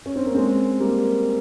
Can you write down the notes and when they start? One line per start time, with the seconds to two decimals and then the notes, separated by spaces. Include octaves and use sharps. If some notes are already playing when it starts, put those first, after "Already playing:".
0.06 C#4
0.16 C4
0.26 A#3
0.35 G#3 C4
0.80 G3 A#3